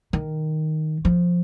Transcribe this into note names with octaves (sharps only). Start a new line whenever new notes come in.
D#3
F3